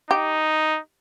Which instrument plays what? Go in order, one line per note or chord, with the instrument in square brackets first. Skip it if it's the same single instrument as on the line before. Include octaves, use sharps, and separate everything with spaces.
[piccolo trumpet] D#4 [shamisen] G4